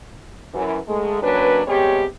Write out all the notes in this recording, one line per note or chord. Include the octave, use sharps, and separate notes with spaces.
F#2 E3
G#2 G#3 A3
F#3 A#3 C#4 D4 B4
C3 G3 G#3 B3 G4 C#5